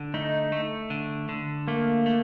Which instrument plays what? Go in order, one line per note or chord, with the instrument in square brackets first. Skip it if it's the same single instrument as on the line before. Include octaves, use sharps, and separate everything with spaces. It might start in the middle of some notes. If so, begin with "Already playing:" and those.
Already playing: [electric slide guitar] D3
[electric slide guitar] A3 [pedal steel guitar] D#4
[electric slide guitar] A3
D3
D3
[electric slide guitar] A3 [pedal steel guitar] A#3
[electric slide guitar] A3